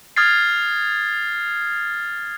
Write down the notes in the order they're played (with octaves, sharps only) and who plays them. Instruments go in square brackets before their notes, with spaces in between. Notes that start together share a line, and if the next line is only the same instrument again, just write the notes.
[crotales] D#6 F6 G#6 A6 C7